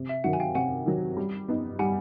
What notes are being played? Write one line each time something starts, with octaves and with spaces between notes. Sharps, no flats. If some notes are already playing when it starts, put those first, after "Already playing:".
Already playing: C3
E5
D#3 F#3 F#5
G#5
F5 G5
C3 F#5 G#5
D#3 F#3
G3
B3 D#4
G3 F#5 G#5